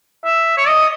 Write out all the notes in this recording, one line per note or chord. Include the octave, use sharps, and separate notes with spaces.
E5
C#5
D#5